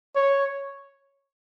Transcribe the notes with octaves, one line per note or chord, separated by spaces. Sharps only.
C#5